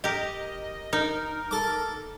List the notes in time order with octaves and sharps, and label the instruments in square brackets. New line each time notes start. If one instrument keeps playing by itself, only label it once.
[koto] G4 A#4 [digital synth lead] D#5
[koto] D#4 [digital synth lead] A#4
[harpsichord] A4 D6